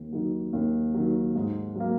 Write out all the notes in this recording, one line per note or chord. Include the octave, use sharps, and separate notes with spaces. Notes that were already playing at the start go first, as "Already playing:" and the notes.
Already playing: D#2
D#3 F#3
D#2
D#3 F#3
G#2
F#3 A#3